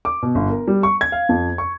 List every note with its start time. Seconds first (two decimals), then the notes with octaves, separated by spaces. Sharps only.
0.05 D6
0.22 B2
0.35 G1
0.49 A#4
0.68 G3
0.83 C#6
1.01 G#6
1.12 F5
1.29 F2
1.58 C#6